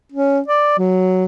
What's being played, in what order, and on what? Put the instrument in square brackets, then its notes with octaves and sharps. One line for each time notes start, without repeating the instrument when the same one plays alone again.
[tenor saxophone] C#4
D5
F#3